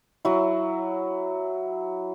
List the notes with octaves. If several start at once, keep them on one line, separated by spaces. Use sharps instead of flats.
F#3 E4